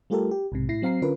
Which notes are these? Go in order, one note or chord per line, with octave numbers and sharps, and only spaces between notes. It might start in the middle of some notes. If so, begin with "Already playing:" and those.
G3 A3 F4 G4 A4 A#4
G4
B1 G#2 C3
A2 E4 A#6 C7
F#3 C4 F5 A#5 C7
D3 C#4 F4 A#4 B4